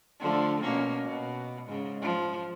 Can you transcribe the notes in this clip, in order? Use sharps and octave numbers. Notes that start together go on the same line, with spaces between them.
D3 F3 A3
B2 A#3 C#4
B2
G#2 C#3
F3